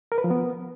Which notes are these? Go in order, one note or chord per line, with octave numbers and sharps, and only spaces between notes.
A#4
B4
F3
B3